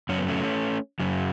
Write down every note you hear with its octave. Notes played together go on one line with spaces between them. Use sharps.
F#2 C#3 F#3 C#4
B3
A3 C#4
F#2 C#3 F#3